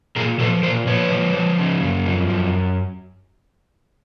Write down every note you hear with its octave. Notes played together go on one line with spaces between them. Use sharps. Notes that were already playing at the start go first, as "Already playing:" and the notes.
A#2 G#4 A#4
F3 A4 B4
A#2 A#4 C5
F3 B4 C#5
F3
F3
C#3
F#2
F3
F#2